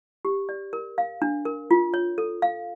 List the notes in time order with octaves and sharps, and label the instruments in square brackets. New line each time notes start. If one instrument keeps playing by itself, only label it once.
[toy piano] G4
D5
A#4
F5
D4
A#4
F4
C#5
A4
F5